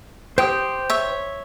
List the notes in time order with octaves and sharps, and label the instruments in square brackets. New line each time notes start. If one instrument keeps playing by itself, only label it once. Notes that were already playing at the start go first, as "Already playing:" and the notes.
[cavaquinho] G4 [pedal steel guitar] C5 G5 D#6
[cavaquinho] C#5 E5